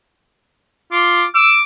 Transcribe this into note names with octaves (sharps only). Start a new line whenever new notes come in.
F4 D6
D6 E6